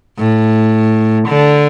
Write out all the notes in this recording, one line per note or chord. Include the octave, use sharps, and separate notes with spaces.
A2
D3